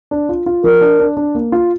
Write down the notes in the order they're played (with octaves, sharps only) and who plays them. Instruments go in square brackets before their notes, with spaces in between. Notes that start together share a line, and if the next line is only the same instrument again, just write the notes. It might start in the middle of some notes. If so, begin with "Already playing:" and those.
[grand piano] D4
F4
F4
[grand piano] F3 [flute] A#4
[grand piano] D4
D4
D4
A#3
F4